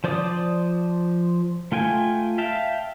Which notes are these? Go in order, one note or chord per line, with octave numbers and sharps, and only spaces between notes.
F3 C5 D5 D6 D#6
A3 F4 G5 G#5
E5 F5 G5 A5